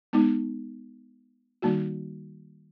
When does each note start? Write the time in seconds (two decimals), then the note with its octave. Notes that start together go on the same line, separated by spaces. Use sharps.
0.13 G#3 B3 D#4
1.62 D#3 G3 A#3 D#4 F#4